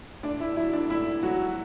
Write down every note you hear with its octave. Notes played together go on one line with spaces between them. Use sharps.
A2 D4 D5
E4 E5
F#3 E4 E5
D4 D5
A2 E4 E5
F#3 F#4